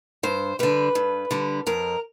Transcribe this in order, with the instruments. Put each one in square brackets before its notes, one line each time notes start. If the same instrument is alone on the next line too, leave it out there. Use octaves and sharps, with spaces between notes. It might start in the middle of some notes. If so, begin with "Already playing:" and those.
[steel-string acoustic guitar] G2 C5
D3 G3 B4
G2
D3 G3
F2 A#4